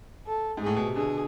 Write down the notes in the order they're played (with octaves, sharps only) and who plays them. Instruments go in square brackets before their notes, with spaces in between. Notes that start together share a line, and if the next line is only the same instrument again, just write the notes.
[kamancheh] A4
[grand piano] G#2 [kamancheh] G#4
[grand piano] A2
B2
C3
[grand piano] B2 D3 [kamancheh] G#4